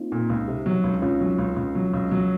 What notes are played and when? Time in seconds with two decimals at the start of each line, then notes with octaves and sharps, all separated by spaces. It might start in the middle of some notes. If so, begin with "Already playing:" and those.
Already playing: A#3 C4 D#4 F4
0.12 A#2
0.30 C#2
0.48 C3
0.66 F#3
0.84 C#2
1.02 C#2 C#4 F4
1.20 F#3
1.39 C#2
1.56 C#2
1.75 F#3
1.94 C#2
2.11 F#3